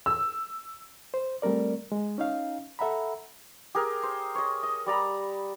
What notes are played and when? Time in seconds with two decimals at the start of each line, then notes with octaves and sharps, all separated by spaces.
0.06 E6
1.14 C5
1.42 G3 A3 C4 A#4 D5
1.92 G#3
2.18 C#4 D#4 F5
2.79 A4 E5 F#5 A#5 B5
3.75 G4 G#4 A#4
4.03 C5
4.35 C#5 D#5
4.63 D#5
4.86 G3 D5 A#5 B5